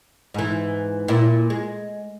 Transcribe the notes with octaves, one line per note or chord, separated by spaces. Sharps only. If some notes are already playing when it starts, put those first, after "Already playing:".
G#2 E3
A#2 E4
G#3